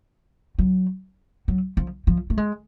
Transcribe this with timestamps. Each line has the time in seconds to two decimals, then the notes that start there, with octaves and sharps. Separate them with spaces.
0.58 F#3
1.48 F#3
1.77 F3
2.07 F3
2.30 A3
2.37 G#3